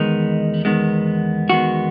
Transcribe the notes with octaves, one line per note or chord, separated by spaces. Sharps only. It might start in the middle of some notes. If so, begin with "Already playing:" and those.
Already playing: E2 D#3 G#3 B3 D#4
E2 D#3 G#3 B3
E2 D#3 G#3 B3 F#4